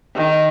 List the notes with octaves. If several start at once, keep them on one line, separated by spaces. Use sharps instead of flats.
D#3